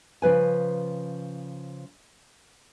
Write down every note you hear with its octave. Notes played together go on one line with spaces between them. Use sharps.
C#3 F3 B4 G#5